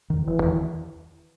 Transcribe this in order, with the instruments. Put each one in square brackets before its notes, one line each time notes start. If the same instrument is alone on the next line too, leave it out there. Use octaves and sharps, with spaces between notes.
[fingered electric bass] E2 D#3
[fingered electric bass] E1 [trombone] E3
[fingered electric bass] E2 D#3